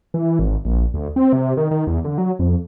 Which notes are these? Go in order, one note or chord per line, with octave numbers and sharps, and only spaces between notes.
E3
G#1
A#1
D2
C4
C3
D#3
D#3
E2
D3
F#3
F2